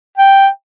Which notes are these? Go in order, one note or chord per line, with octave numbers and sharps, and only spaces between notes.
G5